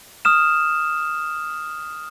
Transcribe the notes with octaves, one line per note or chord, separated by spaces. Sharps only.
D#6 F6 E7